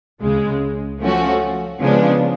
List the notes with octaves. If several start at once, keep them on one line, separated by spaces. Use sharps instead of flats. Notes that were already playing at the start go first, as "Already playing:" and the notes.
C#2 C#3 G#3
F3 A3 C#4 F#4
C#3 F3 G#3 B3 D4